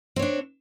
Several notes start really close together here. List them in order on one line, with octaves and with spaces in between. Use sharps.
C4 C#5 D4